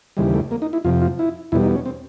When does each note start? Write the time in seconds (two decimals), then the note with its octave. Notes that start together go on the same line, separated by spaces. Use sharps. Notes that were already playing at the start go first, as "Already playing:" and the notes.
0.17 D#2 C#3 E3 G3 G#3
0.34 A3
0.51 A#3
0.62 D#4
0.73 E4
0.85 F2 C3 F3 F4
1.02 F4
1.19 E4
1.52 E2 B2 G3 E4
1.63 D#4
1.75 C#4
1.86 C4